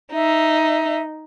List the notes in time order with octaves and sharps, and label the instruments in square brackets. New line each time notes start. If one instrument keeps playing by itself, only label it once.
[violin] D#4 [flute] E5